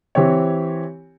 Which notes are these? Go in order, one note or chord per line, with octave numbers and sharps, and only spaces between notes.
E3 C4 G4 C#5